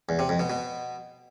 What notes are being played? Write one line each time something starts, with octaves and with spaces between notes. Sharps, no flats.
E2
C3
F2
B2
B2